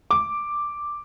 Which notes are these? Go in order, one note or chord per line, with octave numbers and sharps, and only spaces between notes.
D6